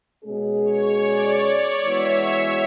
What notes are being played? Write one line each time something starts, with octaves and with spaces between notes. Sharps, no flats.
B2 G#3 C#4 G#4
C#5
D5
E3 G#3 B3 F#4 C#5 E5